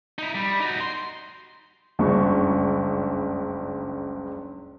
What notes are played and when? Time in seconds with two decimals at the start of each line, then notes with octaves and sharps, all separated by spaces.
0.19 D#4 E4
0.35 G3
0.61 D#4 F#4
0.80 C6
1.99 F#1 C#2 G2 C#3 C#6